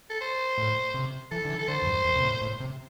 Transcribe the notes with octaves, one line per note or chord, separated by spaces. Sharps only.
A4
C5
A2
C3
E3 A4
D3
E3
A4
D3 C5
E2
G2
E2
C3
A2
A2
C3